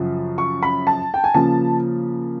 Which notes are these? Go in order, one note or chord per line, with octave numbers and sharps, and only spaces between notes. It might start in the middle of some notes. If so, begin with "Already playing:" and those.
Already playing: F#2 C#3 F3
C#6
B5
A5
G5
G#5
C#3 F3 A#3 A5